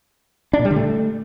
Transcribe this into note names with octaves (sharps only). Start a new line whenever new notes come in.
D4
A#2
G3
D3
A3